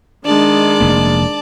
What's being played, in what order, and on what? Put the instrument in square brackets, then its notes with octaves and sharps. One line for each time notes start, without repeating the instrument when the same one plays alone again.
[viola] D#3 G#3 [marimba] D4 [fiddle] D5 A5
[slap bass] F1 A#3